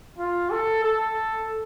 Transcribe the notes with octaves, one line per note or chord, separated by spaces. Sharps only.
F4
A4
A4